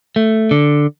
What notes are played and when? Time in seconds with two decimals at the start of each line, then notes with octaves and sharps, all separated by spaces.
0.16 A3
0.51 D3